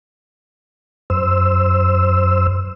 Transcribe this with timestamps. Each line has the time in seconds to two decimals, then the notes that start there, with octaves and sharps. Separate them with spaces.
1.10 F#2 C5 E6